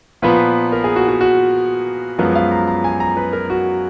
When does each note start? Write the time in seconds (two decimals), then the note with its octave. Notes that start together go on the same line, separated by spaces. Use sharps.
0.22 A#2 F3 B3 B4
0.72 A#4
0.84 G#4
0.96 F#4
1.08 F#4
1.21 F#4
2.18 F#2 F3 G#3 B3 A#4
2.35 F5
2.51 A#5
2.67 A#5
2.84 G#5
3.00 A#5
3.17 B4
3.33 A#4
3.50 F#4